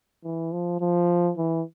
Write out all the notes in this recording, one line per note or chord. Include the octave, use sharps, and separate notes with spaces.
E3
F3
F3
E3